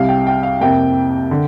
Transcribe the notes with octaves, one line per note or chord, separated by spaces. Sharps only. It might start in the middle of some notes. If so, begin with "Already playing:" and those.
Already playing: C2 C3 G3 F5
G5
G5
F5
F2 C3 A#3 G5
D3